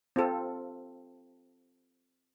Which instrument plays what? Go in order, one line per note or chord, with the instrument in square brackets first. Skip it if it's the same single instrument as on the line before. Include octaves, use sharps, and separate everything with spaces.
[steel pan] C4 F4 A4